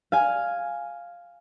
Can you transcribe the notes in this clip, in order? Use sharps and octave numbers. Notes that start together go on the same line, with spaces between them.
F5 G#5